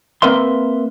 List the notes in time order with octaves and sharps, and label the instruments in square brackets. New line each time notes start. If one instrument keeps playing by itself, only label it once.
[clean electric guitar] A#3 C4 A#4 B4 E5 C6